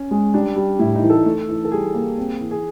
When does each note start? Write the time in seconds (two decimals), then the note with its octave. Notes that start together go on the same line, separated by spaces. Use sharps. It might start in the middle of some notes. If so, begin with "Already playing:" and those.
Already playing: C#4
0.11 G#3
0.34 G3 D4
0.56 G3
0.79 A2 E4
0.95 D#4
1.03 E3
1.10 A4
1.25 A3
1.48 E3
1.65 A4
1.72 G3 G#4
1.94 A#3
2.18 C4
2.41 E3
2.51 G#4